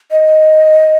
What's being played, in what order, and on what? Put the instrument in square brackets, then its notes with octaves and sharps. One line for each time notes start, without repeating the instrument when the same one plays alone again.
[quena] D#5